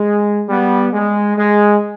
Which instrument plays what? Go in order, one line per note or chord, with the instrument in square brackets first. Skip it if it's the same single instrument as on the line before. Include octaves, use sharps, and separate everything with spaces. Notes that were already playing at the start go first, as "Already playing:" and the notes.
Already playing: [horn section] G#3
G3 B3
G#3
G#3